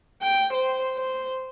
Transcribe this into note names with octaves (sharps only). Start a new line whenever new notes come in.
G5
C5
C5